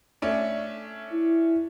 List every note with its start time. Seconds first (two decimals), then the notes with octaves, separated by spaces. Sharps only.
0.22 A3 C#4 D4
1.13 E4